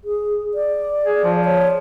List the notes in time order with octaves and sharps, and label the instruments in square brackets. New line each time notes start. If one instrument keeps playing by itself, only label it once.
[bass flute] G#4
D5
[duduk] G#4
F3
[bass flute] C#5